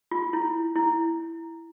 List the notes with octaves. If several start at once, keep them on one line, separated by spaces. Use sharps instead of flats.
F4
E4
E4